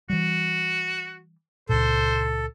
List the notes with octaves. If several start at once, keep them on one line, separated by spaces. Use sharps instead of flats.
E3 G3 F#4
C#2 A#2 A4 C5